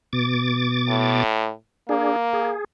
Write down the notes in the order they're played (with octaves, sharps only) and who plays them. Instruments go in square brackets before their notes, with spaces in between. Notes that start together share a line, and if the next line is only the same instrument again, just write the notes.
[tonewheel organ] B2 D6 A6
[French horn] A2
[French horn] A#3 [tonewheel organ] D4 G#4
[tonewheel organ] G#4